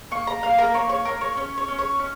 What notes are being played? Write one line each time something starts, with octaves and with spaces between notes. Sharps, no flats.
A#3 C#6
A#5
A#3 F5
A#4
A#3 C#5
C#5
A#3 A#4
C#5
C#4 C#5
C#5
C#4
C#5
C#4